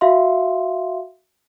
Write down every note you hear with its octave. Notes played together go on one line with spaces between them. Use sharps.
F#4 E5 F5 C6